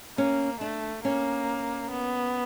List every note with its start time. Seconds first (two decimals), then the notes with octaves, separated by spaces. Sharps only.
0.18 A#3 C#4
0.61 A3 D4
1.04 A#3 C#4
1.91 B3